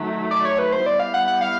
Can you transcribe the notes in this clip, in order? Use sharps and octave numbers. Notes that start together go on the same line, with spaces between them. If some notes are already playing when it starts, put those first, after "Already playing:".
Already playing: D#3 F#3 A3
D5
C#5
B4
C5
G3 B3 E4 G4 D5
F5
F#5
F#5
F5